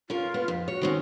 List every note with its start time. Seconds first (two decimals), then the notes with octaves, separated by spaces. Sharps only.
0.10 C#4 F4 A#4
0.34 B3
0.48 F2
0.68 F#4 C#5
0.81 D#3 C4 C#4